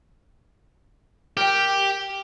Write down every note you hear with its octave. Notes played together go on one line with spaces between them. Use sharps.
G4 A#4 G5